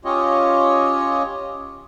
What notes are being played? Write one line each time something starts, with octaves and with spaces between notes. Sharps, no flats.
C#4 F4 G4 C#5 D#5